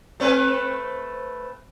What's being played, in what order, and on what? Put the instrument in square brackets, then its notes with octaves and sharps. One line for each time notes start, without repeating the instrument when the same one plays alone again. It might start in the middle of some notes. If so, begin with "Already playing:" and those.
[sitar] A3 C4 B4